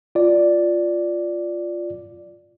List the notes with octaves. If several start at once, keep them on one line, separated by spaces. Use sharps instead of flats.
F4 D5